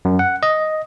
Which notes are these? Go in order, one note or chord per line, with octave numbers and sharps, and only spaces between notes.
F#2
F#5
D#5